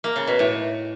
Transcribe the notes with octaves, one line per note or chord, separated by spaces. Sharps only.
A#3
C#3
B2
A2